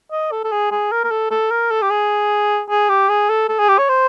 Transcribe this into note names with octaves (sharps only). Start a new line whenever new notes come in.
D#5
A4
A4
G#4
G#4
A#4
A#4
A4
A4
A#4
A4
G4
G#4
G#4
G4
G#4
A4
A4
G#4
G4
C#5
C5